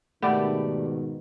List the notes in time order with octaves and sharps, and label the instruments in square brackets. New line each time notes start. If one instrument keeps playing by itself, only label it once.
[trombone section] G#2 B2 D#3 [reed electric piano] A3 G4 D5 [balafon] F#5 B5